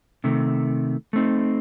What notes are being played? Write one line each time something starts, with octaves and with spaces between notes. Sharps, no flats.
C3 D#3 A3
A3 C4 D#4